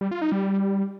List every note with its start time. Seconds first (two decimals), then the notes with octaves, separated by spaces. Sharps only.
0.01 G3
0.11 F4
0.22 D#4
0.32 G3